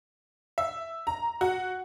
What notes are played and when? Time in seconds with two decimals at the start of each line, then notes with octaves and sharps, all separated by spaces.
0.58 E5
1.07 A#5
1.41 F#4